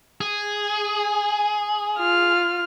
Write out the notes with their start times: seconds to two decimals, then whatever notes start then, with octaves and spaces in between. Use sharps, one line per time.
0.21 G#4
1.99 F4 F6